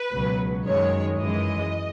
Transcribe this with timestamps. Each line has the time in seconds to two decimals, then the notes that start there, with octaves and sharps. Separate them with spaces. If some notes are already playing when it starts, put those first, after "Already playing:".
Already playing: B4
0.13 C#2 B2 F#3
0.66 F#2 D#3 G#3 C#5
1.18 F#2 E3 G#3 D#5